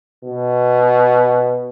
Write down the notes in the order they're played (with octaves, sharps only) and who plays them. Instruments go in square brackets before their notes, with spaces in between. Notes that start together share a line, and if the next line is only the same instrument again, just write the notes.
[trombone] B2